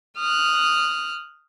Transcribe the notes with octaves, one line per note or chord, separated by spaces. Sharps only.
D#6 F6 F#6